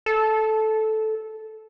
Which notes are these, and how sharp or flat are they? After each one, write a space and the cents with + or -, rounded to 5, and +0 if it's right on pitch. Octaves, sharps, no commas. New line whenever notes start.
A4 -10